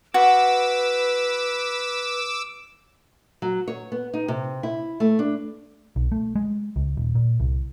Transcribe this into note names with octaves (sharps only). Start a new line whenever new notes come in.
F#4 B4 D6 E6
F#3
C#5
B3
D#4
C3
E4
A3
D4
B1
A3
G#3
C#2
D#1
A#2
C2